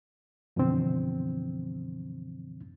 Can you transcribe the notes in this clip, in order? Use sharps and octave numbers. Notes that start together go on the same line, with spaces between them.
F#2 B2 D3 E3 F3 C4